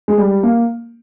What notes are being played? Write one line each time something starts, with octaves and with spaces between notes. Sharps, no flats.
G#3
G3
A#3